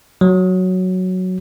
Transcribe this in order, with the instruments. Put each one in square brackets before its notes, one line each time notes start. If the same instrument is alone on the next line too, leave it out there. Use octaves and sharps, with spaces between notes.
[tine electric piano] F#3